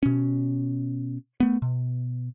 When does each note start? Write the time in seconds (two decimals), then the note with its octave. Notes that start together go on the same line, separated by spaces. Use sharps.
0.03 B2 C#4
1.40 A3 B3
1.62 B2